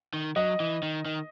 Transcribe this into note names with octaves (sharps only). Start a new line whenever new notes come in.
D#3
F#3 D#5
E3
D#3
D#3